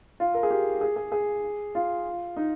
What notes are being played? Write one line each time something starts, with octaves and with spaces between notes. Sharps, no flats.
F4
A#4
G#4
G4
G#4
G#4
G#4
F4
D#4